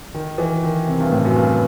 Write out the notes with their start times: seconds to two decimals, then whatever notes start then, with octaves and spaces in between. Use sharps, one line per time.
0.14 D#3
0.38 E3
0.63 D#3
0.87 C3
1.00 G2
1.11 A2
1.25 F#2
1.36 G2